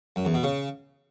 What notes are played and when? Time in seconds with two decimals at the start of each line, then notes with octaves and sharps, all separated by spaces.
0.16 F#2
0.25 E2
0.34 B2
0.43 C#3